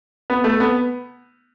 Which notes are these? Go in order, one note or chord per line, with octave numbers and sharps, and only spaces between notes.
B3
A3
B3